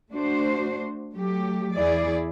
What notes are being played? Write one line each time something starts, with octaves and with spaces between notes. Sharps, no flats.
A3 D4 F#4 C5
F#3 A3 G4
E2 E4 G#4 D5